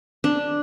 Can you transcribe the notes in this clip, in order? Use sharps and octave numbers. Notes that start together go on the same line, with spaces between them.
D4